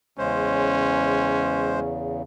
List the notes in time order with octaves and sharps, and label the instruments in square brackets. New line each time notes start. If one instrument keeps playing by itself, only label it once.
[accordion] E2 C#3 [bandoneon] G#3 C5 [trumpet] C#4